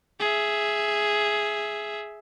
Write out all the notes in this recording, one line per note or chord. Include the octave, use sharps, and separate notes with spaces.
G#4 E5